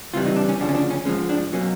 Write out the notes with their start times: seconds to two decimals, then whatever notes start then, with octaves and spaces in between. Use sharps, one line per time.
0.14 C#2 C3 E3 G3 F4
0.26 D#4
0.36 D4
0.49 C#4
0.60 D2 C#3 F3 D4
0.69 C#4
0.75 D4
0.91 C#4
1.05 G#3 C#4
1.09 G#2 F3
1.29 D4
1.53 B2 F#3 A#3 C#4